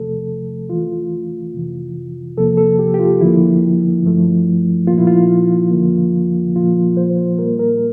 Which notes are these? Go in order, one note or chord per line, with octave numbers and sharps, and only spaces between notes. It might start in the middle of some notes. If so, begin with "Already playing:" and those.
Already playing: E2 C3 F3 A3 A4
E2 E3 A3 F4
F2 C3 E3
E2 C3 F3 A#3 A4
A4
G4
G4
F4
E2 D3 F3 A#3 E4
G2 F3 A3
A#2 F3 A#3 F4
E4
F4
F2 D3 F3 A#3
A#2 F3 A#3 F4
C5
A#2 G3 A#3 A#4
A#4